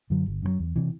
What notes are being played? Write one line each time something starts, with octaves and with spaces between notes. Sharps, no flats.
F#2 D3 F#3
G1
F#2 D3 F#3
E2
C3 E3